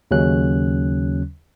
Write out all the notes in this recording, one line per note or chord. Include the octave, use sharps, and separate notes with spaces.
D#2 C#3 F#3 C#4 F#6